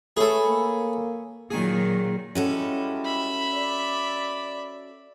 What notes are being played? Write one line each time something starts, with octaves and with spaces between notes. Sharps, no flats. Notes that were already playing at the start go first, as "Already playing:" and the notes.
A3 G#4 A4 B4 C#5 G#5
A#3
A#2 D#3 F#3 G#4
G3 G#3 C#4 E4 F#4 A4
E5 B5
D5